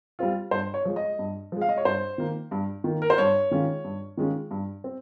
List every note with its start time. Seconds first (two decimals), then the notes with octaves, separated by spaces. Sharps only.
0.19 G3 C4 F4
0.51 G2 C5
0.74 C#5
0.85 F3 G#3
0.96 D#5
1.19 G2
1.52 F3 G#3
1.61 F5
1.69 D#5
1.78 C#5
1.85 G2 C5
2.18 D#3 A#3
2.51 G2
2.84 D#3 A#3
3.02 A#4
3.10 C5
3.18 G2 C#5
3.51 D#3 G#3 C#4 F4
3.84 G2
4.17 D#3 G#3 C#4 F4
4.51 G2
4.84 C4